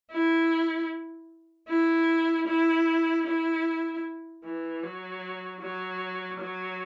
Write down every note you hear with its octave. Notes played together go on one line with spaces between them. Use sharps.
E4
E4
E4
E4
E3
F#3
F#3
F#3